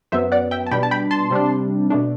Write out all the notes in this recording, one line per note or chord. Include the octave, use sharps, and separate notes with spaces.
F#2 F#3 B3 C5 E5
D5 F#5
E5 G5
A5
B2 G3 D4 G5 B5
A5
G5 B5
A5 C6
C3 G3 D4
B2 A3 D4